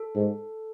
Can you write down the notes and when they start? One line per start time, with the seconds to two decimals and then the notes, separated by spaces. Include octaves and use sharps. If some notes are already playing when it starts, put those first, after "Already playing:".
Already playing: A4
0.15 G#2